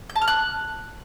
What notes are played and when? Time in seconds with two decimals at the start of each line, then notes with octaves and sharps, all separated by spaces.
0.10 G6
0.16 A5
0.22 F6
0.28 F#6